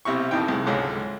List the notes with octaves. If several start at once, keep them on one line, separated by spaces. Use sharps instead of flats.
B1 C3 E4 C#6
A#1 F2 D#3 E3 D#4 G5
C2 G#3
C#2 G#2 D3 F#3